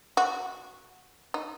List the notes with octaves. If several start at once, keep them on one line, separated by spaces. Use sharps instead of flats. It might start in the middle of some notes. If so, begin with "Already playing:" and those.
F#4
D#4